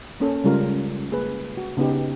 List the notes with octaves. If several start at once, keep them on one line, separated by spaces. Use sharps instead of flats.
A#3 C#4 A4
C#3 G3 G#3 F4 A#4
A#3 G#4 B4
F#4
C#3 B3 D#4 G4